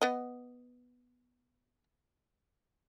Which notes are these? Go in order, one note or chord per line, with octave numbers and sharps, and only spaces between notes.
B3 D#5